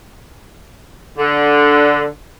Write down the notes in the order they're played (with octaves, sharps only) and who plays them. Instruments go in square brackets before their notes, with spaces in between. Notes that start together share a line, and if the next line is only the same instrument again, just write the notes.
[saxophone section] D3